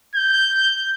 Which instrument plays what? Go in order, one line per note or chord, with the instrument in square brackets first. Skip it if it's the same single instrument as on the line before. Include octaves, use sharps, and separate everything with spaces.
[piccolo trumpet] G6